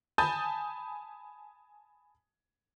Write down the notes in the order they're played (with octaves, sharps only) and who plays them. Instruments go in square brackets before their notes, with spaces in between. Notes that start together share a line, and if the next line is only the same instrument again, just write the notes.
[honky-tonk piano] G#5 A5 B5 D#6 G6 A6